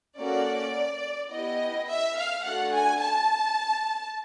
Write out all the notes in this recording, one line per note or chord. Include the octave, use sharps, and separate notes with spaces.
A#3 C#4 F#4 A4 D5
B3 E4 G4 D#5
E5
F5
A3 D4 F#4 A4 F#5
G#5
A5